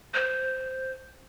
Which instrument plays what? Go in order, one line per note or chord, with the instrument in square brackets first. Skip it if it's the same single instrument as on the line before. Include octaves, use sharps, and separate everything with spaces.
[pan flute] C5